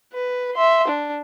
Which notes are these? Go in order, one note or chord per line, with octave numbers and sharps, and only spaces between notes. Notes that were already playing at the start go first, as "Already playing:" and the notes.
B4
E5 C6
D4